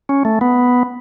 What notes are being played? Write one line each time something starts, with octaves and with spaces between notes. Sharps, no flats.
C#4
A3
B3